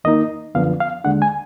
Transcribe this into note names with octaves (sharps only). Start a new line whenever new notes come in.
D#2 D#3 A#3 D#4 D#5
F#2 D3 F3 B3 D4 F5
F5
D#2 D3 G#3 D4 F#5
G#5